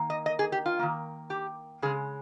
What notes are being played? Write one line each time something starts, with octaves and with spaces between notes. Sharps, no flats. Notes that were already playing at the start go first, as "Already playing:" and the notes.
Already playing: D#3 A#3
D#5
D#5
G#4
G4
F4
D#3 A#3
G4
C#3 G#3 G#4